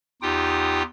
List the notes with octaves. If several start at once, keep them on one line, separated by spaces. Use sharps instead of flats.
E2 D#4 F4 G4 G5 D#6